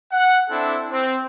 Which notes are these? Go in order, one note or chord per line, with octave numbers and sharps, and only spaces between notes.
F#5
C4 D4 E4 A4
C4